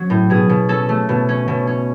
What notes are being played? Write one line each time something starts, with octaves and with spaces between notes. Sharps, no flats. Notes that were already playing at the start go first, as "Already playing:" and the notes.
Already playing: F#3 C#4
A2
B2 G#4
B2
C#4 A4
A3
B2
C#4
B2
C#4